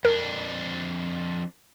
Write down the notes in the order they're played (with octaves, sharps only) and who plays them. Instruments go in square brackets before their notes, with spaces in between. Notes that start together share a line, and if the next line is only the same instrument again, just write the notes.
[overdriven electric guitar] F2 D4 [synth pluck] A#4